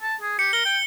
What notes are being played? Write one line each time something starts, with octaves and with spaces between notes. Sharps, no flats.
A5
G#4
G4 C#7
A#4 G7
G5